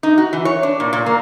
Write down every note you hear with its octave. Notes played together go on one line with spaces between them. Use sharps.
D#4
F#4
E3
C#5
D4
A#2
A#2
A#3